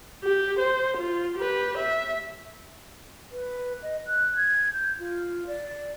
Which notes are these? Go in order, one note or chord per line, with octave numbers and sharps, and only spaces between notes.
G4
C5
F4
G4 B4
E5
B4
D#5
F#6
G#6
G6
F4
D5